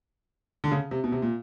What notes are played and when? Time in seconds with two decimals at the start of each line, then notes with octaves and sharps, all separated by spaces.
0.64 D3
0.71 C#3
0.91 C3
1.04 B2
1.12 C3
1.22 A#2